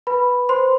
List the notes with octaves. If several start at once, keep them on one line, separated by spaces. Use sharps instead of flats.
B4 B5
C5 C6